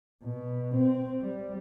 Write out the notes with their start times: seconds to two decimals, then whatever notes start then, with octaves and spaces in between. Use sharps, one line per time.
0.24 B2
0.75 C4
1.22 G3